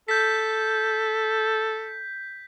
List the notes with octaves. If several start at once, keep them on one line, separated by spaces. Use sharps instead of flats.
A4 G6 B6